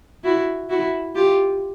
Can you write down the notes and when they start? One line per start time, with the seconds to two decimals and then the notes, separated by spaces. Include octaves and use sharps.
0.24 E4 F#4
0.69 E4 F#4
1.15 F4 G4